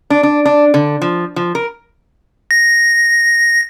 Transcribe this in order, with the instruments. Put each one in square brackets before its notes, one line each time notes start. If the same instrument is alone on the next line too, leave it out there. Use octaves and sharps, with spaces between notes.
[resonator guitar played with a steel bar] D4
D4
D4
D3
F3
F3
A#4
[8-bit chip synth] A#6